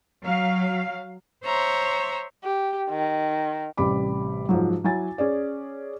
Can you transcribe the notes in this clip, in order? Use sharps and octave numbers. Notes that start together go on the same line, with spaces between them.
F#3 F5
C5 C#5 E5 A#5 C6
G4
D#3
A1 C3 G3 B5 D6
G#2 F3 F#3
F#3 E4 G#5 A6
C#4 G#4 D5